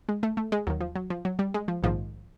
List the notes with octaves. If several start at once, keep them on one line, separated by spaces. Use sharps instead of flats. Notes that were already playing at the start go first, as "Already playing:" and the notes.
G#3
A3
A3
G#3
D#2 D#3 F#3
F3
F#3
F3
F#3
G3
G#3
F3
A#1 G#2 D#3 F3